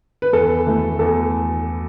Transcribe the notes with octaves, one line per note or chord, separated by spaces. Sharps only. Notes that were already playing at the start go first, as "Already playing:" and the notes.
B4
E2 A4
E3 A3
E2 A4